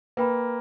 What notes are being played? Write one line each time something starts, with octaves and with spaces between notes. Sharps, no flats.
A#3 B4 G5 B5